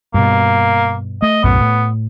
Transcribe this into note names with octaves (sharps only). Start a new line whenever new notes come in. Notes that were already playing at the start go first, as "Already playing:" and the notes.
G2 B2 A#3
A3 D#5
B1 F#2 A2 B3
A2